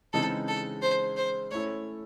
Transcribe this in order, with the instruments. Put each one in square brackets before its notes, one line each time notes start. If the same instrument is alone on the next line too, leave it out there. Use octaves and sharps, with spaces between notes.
[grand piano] C#3 E3 G#3 C4 D#4 [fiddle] A4
[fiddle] A4
C5
C5
[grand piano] A3 C#4 E4 A4 [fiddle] C#5